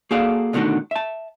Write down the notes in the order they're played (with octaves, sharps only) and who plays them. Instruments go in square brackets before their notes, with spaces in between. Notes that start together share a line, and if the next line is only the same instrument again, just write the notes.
[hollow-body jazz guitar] A#3 F#4 G#4 A4 D5 F5
B2 D3 D#3 A3 F#4
E5 A5